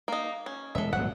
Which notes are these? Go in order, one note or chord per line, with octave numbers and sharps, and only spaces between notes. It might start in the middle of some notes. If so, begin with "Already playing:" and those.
A#3 D#4
C#4
E1 G#3 A4 E5
D#1 G#1 F#3 F#5